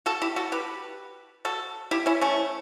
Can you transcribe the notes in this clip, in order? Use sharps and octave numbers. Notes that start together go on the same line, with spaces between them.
F#4 A4
E4 G4
F#4 A4
G4 B4
F#4 A4
E4 G4
C#4 E4
A3 C#4